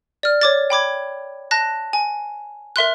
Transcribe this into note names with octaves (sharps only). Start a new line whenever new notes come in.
D5 F6
C#5 D6 A6
G5 B5 D6 G#6
A5 F#6 A#6
G#5
A#4 E5 C6 F#6